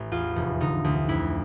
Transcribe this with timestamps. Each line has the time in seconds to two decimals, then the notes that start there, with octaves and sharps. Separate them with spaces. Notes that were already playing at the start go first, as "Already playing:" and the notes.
Already playing: A1 A2
0.12 E2 F4
0.36 F1
0.60 D3 D#4
0.84 D2
1.09 F2 E4